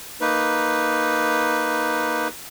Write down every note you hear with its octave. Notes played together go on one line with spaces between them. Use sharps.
A#3 D#4 B4